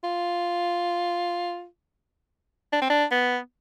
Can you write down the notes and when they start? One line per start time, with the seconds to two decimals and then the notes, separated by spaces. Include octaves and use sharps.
0.04 F4
2.72 D4
2.81 C4
2.90 D4
3.11 B3